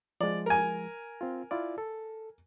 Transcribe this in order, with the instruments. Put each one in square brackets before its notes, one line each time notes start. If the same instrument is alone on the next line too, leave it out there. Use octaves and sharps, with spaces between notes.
[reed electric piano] F3 G#3 [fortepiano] D5
[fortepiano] A#4 G#5
[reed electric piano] C4 F4
E4 F4 D5
A4